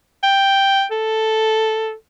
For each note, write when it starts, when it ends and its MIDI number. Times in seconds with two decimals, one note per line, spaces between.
0.23 0.85 79
0.91 1.93 69